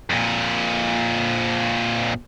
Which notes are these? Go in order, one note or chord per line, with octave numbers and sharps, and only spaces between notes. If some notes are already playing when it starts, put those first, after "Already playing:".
F2 A#2